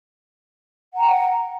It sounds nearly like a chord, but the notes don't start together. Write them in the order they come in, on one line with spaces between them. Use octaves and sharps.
F#5 A#5 G5